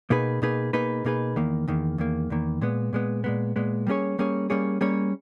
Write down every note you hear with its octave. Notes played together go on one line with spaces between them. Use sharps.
B2 A#3 D#4 G#4 B4
B2 A#3 D#4 G#4 B4
B2 A#3 D#4 G#4 B4
B2 A#3 D#4 G#4 B4
E2 D#3 A#3
E2 D#3 A#3
E2 D#3 A#3
E2 D#3 A#3
A#2 G#3 B3
A#2 G#3 B3
A#2 G#3 B3
A#2 G#3 B3
G3 A#3 C#4 G#4 C#5
G3 A#3 C#4 G#4 C#5
G3 A#3 C#4 G#4 C#5
G3 A#3 C#4 G#4 C#5